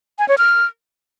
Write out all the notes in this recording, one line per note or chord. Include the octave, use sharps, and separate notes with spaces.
G#5
C#5
F6